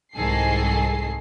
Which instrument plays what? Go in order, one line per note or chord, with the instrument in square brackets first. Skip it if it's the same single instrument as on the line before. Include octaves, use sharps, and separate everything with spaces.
[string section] C2 G#2 D#3 G#4 A4 C7